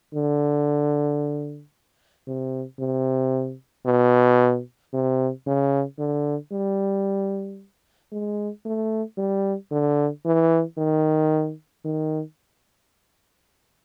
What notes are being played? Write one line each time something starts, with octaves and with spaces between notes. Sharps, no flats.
D3
C3
C3
B2
C3
C#3
D3
G3
G#3
A3
G3
D3
E3
D#3
D#3